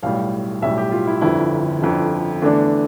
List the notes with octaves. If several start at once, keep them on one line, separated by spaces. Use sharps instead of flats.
B1 A2 G3 F5
B1 A2 G3 E5
G4
F4
E4
G1 F2 D3 E4
G1 F2 D3
E2 D3 A3 D4